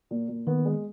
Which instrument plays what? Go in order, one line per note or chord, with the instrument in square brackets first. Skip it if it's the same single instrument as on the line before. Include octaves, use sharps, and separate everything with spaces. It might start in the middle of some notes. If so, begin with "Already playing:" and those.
[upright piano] A#2
A#2
[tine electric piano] D#3 [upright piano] B3
[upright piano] G#3